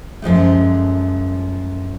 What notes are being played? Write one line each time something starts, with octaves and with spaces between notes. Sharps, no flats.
F#2 F3 G#3 A3